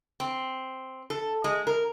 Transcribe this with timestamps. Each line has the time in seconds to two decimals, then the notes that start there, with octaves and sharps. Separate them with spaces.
0.20 C4
1.10 A4
1.44 G#3
1.67 A#4